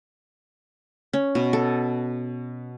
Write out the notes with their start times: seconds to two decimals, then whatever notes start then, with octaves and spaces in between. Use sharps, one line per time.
1.13 C#4
1.35 B2
1.53 A4